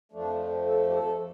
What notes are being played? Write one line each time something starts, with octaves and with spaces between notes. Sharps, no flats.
F2 F3 A3 D4
A4
G4
A4